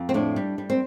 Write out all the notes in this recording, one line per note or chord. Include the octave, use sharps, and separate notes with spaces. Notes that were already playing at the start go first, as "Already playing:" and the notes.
Already playing: F2
C4
A2 D4
G3
G3
C4